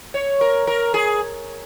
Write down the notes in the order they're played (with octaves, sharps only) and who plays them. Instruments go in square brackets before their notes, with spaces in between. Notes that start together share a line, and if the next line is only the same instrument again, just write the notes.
[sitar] C#5
A#4
A#4
G#4